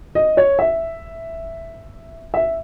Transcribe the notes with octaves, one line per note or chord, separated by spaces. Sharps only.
D#5
C#5
E5
E5